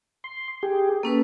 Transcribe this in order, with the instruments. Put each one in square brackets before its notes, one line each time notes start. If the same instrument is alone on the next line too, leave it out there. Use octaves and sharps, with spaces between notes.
[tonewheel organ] C6
G4 G#4
[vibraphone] A#3 C#4 B4 [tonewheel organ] A4